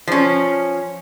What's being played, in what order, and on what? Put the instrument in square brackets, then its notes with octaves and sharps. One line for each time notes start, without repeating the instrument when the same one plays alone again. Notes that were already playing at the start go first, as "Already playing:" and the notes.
[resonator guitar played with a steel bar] F3 C#4